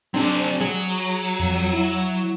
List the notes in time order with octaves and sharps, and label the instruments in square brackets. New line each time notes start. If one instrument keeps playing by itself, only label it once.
[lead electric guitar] F#3 G#4 [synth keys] C4 D4 A5
[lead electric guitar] F#3 [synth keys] G#4
[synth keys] F2
E4 E7